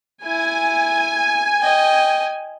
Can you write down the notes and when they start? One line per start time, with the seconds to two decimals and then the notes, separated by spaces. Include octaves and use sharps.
0.24 E4 G#5
1.61 D#5 G5